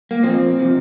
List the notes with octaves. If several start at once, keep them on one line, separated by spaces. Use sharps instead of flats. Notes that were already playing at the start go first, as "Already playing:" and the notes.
A#3
A#2 F3 C4
C3 F3